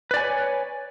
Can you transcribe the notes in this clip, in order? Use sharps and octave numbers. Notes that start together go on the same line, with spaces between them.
B4 C#5 D5 G#5